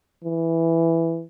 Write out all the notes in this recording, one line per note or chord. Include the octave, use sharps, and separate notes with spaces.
E3